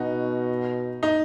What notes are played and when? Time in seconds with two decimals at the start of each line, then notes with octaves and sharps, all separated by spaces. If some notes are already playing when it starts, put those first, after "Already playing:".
Already playing: B2 D#4 F#4
1.03 D#4